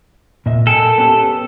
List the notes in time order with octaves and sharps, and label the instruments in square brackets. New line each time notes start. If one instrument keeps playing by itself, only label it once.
[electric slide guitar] A#2 D#5 E5
[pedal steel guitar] A4 [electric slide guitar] A#4 G5 G#5
[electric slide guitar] B3 C#4 G4